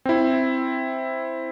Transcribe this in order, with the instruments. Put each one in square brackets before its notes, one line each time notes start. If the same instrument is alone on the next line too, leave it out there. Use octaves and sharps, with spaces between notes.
[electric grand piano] C4 E4